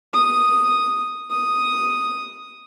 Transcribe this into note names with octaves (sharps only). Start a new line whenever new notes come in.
D#6
D#6